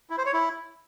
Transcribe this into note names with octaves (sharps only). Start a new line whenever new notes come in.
E4
C5
C#5
E4